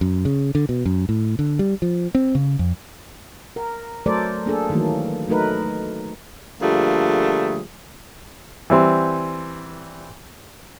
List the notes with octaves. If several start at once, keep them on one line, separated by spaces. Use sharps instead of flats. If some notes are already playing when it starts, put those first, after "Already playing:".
F#2
C#3
D3
B2
F#2
A2
D3
G3
F3
C4
C#3
F2
A#4
F#3 A3 A4 A#4 C5 D5
A#3 D4 G#4 A4
D#3 E3 F#3 A3 A#3
F#3 A3 D#4 A#4 B4
D3 F3 G3 A3 A#3 G#4
E3 G3 C4